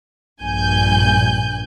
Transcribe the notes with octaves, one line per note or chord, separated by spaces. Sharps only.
A#1 G2 G#5 G6